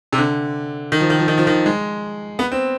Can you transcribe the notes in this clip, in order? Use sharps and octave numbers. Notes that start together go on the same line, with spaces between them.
C3
D3
D#3
F3
D#3
F3
D#3
F3
D#3
G#3
B3
C4